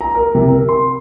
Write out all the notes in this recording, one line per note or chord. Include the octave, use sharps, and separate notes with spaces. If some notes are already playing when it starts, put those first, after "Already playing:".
A#5
A#4
C3
A#4
C6